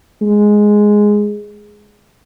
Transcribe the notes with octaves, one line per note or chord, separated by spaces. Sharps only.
G#3